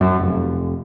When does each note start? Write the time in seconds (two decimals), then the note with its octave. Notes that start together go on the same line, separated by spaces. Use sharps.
0.01 F#2
0.19 F1